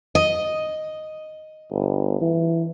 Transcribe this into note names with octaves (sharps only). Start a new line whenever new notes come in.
D#5
G1
E3